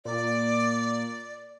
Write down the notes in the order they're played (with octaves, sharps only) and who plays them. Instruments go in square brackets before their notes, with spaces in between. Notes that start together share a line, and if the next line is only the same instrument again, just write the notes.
[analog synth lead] A#2 [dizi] D5